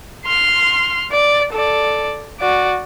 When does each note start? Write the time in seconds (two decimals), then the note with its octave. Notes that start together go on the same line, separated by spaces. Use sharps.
0.25 C6 F6
1.12 D5
1.53 A4 D5
2.40 F#4 D5